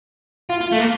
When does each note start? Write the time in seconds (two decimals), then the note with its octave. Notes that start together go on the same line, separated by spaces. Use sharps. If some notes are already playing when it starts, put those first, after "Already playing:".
0.50 F4
0.61 F4
0.72 A3
0.79 A#3